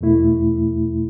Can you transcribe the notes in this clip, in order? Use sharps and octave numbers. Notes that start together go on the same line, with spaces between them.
E2 B2 A3 E4